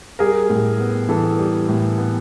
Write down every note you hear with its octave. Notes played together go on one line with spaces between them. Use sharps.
G3 G#4 A#4
A2
B3
E3 A4 B4
G3
A2
B3